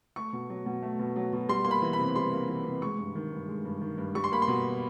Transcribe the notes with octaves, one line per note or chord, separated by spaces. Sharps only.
A3 C#6
B2
F#3
B2
A3
B2
F#3
B2
G3 C6
A#3 C6
B5
E3
B5
C3
G3 C6
A#3
E3
C3
G#3 C#6
G2
D#3
G2
G#3
G2
D#3
G2
G3 C#6
C6
A#3 B5
C6
B2